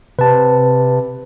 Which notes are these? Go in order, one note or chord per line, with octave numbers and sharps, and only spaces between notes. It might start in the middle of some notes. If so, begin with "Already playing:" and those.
C3 B4 A5